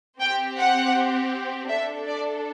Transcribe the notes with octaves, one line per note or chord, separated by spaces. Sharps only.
C4 G4 G5
F#5
D4 A4 E5
D5